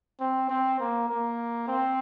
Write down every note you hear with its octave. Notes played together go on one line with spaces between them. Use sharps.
C4
C4
A#3
A#3
C4